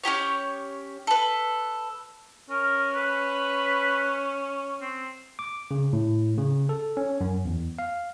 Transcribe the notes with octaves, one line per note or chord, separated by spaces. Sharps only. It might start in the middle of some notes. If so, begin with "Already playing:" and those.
C#4 E4 G4 C#5
A4 B4
C#4 A#4
B4
C4
D6
C#3
A2
C#3
A4
C#4
F#2
E2
F5